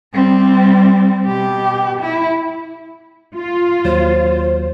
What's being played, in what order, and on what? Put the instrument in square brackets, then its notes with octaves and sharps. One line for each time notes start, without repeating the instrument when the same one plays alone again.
[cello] G3 C4
B2 G4
E4
[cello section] F4
[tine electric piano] D#2 F#3 [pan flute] C5